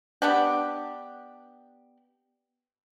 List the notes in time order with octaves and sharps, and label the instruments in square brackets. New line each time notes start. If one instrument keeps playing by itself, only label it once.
[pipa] B3 D4 G4